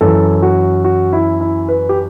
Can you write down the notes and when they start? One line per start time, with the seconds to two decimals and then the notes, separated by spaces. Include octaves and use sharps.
0.01 F#2 E3 A4
0.42 F#4
0.84 F#4
1.13 E4
1.41 E4
1.69 B4
1.89 G4